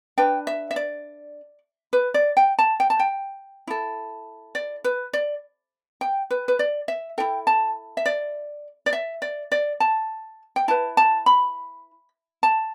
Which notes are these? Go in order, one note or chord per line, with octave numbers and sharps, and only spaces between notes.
D4 B4 G5
E5
E5
D5
B4
D5
G5
A5
G5
A5
G5
E4 A4
D5
B4
D5
G5
B4
B4
D5
E5
E4 A4 G5
A5
E5
D5
D5
E5
D5
D5
A5
G5
E4 B4 A5
A5
B5
A5